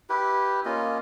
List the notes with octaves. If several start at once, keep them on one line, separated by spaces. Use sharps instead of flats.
E4 G4 B4
A#3 C#4 F4 D#5